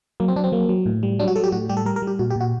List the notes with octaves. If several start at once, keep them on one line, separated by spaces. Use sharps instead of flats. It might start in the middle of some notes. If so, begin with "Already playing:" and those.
F#3 A#3
C4
F#3 D4
C4
F#3 A#3
F#3
A2
G3
F#3 D4
F#4
F#3 A4
G4
A2 F#4
G3 G4
A4
G3 A#4
A#4
G3
G4
A#2 F#4
G4
A#2 F#4